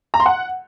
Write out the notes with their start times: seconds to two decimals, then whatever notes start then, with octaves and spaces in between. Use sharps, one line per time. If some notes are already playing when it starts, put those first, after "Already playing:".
0.14 A#5
0.20 C6
0.26 F#5